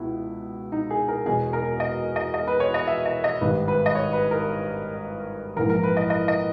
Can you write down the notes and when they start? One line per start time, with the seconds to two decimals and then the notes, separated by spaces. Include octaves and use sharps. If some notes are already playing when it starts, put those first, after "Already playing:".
Already playing: C#2 B2 E4
0.72 D#4
0.90 G#4
1.08 A#4
1.26 E1 E2 B2 G#4
1.53 A#4
1.80 D#5
2.16 D#5
2.34 D#5
2.47 B4
2.60 C#5
2.74 D#5
2.87 E5
3.06 D#5
3.24 D#5
3.41 G#1 G2 D#3 B4
3.68 B4
3.86 D#5
3.95 C#5
4.13 B4
4.31 A#4
5.56 A#1 G#2 E3 A#4
5.70 A#4
5.83 B4
5.97 D#5
6.10 D#5
6.28 D#5